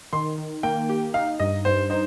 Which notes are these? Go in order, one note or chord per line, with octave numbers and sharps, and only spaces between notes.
D#3 C6
D#3
A#3 G5
G4
D#4 F5
G2 D#5
G2 C5
D#4 C5